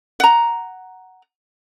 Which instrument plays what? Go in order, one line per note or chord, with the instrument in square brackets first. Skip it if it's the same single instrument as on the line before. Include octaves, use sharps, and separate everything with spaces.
[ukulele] F#5 A#5